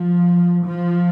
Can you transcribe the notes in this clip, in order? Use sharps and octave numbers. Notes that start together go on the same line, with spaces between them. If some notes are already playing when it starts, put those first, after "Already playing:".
Already playing: F3
F3